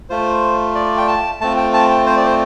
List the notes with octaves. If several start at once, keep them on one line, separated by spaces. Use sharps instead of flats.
A3 F4 C5
D5
G5
A5
A3 C4 F4 A5
G5
A5
G5
C5
D5
C5